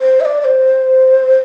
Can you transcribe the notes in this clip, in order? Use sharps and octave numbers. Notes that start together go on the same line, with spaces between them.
C5
E5
D5
D5
C5